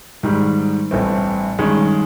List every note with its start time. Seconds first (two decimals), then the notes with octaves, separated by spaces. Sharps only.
0.23 G#2 D#3 G3
0.91 A1 G2 E3 A3 C4
1.59 G2 D#3 G#3 C#4